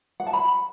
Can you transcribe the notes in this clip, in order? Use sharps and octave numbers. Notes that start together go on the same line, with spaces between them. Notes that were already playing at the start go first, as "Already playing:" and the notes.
F#5
A5
B5